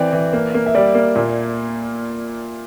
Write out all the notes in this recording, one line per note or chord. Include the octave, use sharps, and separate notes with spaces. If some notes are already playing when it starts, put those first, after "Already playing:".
Already playing: E3 C4 D5 G5
E3
A#3
A#3
E5
G3 D5
A#3
A#2